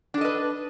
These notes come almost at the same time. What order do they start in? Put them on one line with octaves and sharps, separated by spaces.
D4 A4 D#5 B4